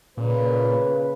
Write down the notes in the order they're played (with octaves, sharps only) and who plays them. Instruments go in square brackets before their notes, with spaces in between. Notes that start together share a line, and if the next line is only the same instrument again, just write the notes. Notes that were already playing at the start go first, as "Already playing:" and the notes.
[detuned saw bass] A#2 [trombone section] C#3 B4